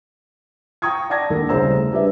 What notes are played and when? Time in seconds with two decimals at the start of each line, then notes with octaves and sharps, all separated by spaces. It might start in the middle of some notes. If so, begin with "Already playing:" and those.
0.82 G5 A#5 C#6 D#6 G#6
1.10 D5 F#5 A5 D6 G#6 A#6
1.30 D#2 D3 A4 A#4
1.49 C2 C#3 C5 A#5 E6
1.70 A3
1.91 G3 D4 G4 B4 E5